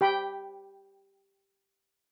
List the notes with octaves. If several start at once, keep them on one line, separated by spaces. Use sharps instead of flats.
G4 G5 B5